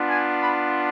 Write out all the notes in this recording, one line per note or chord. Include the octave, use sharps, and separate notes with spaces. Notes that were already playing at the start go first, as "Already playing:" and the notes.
Already playing: B3 D4 F4
G#5
B5